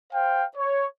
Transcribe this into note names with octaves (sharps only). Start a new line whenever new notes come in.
C5 F5 G5
C#5